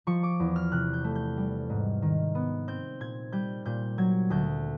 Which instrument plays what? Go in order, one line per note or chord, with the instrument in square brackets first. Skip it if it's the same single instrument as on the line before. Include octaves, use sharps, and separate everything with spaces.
[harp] F3 C#6
D6
E2
F6
C3 F#6
G6
A3
G6
G3
G#2
D#3
B3
C4 G6
A#2 G#6
G3 G6
A#2 G6
F#3 G#6
D2 G6